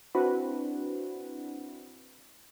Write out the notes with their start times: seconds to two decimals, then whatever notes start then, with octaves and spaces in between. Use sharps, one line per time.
0.15 C4 D4 E4 F#4 B4